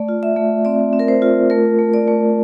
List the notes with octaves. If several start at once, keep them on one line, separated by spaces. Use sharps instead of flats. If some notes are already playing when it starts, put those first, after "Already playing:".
Already playing: A3 D5
F4
E5
A3
C4 D5
C4
A#4
C5
F4
A3 A#4
A3
D5
A3